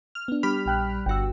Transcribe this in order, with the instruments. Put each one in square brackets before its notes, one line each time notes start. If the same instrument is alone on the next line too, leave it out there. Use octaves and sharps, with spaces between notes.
[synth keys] F6
[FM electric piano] B3 D4
[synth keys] G3 B5 F6
[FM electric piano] A#1 G5 F#6
[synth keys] G1 F#4 [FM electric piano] G5 E6